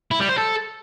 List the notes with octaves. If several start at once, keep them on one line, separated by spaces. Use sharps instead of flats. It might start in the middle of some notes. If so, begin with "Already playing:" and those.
E4
G3
C5
A4